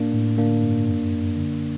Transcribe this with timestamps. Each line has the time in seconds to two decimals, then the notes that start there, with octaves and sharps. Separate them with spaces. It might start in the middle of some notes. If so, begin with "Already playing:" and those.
Already playing: A2 A#3 D4
0.14 A2
0.38 D3 A#3 D4
0.63 G2
0.87 F#2
1.12 F#2
1.36 D3